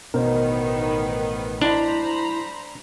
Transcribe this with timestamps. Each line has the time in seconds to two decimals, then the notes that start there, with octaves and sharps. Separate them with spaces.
0.14 A1 B2 D#3 B3 A#4 C5
1.62 D4 E4 C5 A#5 B5